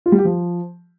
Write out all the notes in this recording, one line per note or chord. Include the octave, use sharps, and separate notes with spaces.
F4
G3
G4
F3